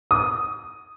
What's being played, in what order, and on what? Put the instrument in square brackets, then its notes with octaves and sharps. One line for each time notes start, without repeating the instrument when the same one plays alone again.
[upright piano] D#6